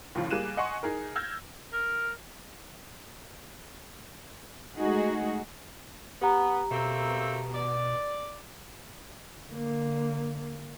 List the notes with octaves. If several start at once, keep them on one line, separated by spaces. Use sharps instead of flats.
D#2 A2 C#3 F3
G3 A#3 G#4 F#6 D#7 E7
D#5 F#5 G#5 C6 C#6
D#4 G#4 A#4
E6 F6 G6 G#6 A#6
A#4
G#3 A3 D#4 F#4 G#4
B3 G4 A#5
B2 A3 A#3 C4
D5
D3 A#3